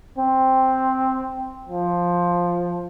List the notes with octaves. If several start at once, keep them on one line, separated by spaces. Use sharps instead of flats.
C4
F3